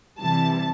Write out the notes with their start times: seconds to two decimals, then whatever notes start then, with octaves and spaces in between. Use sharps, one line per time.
0.19 C3 E3 G3 A5